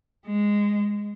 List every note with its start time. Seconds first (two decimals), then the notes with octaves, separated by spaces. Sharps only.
0.27 G#3